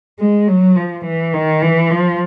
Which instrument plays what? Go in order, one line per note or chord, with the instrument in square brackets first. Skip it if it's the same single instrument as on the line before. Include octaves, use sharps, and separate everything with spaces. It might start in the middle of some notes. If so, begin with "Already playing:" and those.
[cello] G#3
F#3
F3
E3
D#3
E3
F3